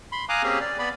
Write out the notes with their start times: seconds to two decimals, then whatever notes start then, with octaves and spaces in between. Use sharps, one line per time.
0.12 B5 C6
0.29 F5 G#5 A#5 D6 D#6 F#6
0.43 A#3 C4 C#4 G4 G#4
0.61 D5
0.79 B3 D5 B5